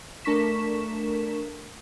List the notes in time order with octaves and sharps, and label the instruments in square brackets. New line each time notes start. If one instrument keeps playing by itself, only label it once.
[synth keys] A3 D4 A#4 C#6 B6 E7